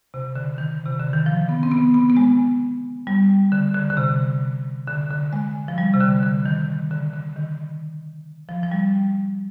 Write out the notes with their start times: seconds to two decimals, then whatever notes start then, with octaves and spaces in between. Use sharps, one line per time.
0.14 C3
0.35 D3
0.58 D#3
0.86 C3
0.99 D3
1.13 D#3
1.26 F3
1.49 B3
1.63 C4
1.71 B3
1.94 B3
2.10 B3
2.17 G#3
3.07 G3
3.52 D3
3.74 D3
3.90 D3
3.97 C3
4.87 D3
5.11 D3
5.33 G#3
5.68 F3
5.78 G3
5.94 C3
6.00 D3
6.23 D3
6.46 D#3
6.91 D3
7.13 D3
7.36 D#3
8.49 F3
8.63 F3
8.72 G3